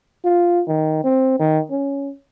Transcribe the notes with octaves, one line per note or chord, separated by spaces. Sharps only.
F4
D#3
C4
D#3
C#4